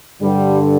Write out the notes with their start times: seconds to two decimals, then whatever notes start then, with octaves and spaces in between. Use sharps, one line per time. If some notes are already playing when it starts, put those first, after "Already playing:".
0.22 G2 D3 G3